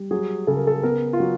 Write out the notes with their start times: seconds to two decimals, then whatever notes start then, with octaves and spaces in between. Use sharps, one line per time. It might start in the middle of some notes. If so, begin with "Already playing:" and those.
Already playing: G3
0.11 F#3 G#4
0.47 C#3 A4
0.57 A#4
0.67 A4
0.83 B3 A#4
1.13 F4
1.20 F#3 F#4